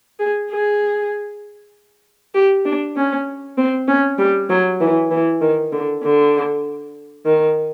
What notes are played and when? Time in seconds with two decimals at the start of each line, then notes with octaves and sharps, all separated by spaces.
0.20 G#4
0.51 G#4
2.35 G4
2.66 D4
2.96 C#4
3.57 C4
3.88 C#4
4.18 G3
4.50 F#3
4.81 E3
5.11 E3
5.41 D#3
5.73 D3
6.03 D3
7.25 D#3